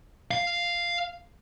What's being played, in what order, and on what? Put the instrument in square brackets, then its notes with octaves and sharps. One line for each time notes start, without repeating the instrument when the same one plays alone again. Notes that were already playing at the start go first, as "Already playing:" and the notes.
[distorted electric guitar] F5